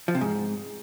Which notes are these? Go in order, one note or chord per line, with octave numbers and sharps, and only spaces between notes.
F3
C3
G#2